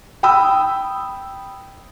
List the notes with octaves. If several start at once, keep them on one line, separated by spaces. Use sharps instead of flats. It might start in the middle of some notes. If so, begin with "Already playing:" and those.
G5 B5 D#6 E6